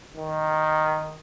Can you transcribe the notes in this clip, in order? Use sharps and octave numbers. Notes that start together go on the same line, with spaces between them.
D#3